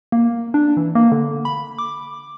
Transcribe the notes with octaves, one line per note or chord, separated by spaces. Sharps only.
A#3
D4
E3
A#3
D3
B5
D6